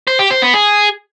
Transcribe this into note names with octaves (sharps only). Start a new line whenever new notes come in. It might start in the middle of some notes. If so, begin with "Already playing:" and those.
C5
G4
C5
B3
G#4